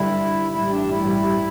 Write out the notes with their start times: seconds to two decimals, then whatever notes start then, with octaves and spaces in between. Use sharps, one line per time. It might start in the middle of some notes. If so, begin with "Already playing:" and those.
Already playing: G2 D3 G3 E4
0.52 A1 G2 G3 E4
0.71 D4
0.89 E4